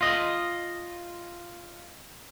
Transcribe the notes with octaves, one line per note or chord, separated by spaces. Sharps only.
F4 D#5